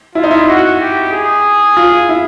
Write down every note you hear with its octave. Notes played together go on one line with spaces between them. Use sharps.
E4 F4
D#4
E4
F#4
G4
G#4
F4
E4